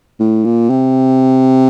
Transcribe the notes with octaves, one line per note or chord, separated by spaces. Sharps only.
A2
A#2
C3